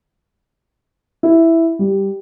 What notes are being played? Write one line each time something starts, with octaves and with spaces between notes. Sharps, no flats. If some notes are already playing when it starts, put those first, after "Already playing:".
E4
G3